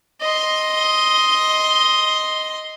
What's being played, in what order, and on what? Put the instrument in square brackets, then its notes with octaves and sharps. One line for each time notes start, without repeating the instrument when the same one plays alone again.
[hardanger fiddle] D#5 C6